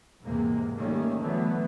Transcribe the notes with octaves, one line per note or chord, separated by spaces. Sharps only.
E2 G#2 C3 G#3 A#3
D#3 G3 A3 A#3 C#4
D3 E3 F#3 A3 B3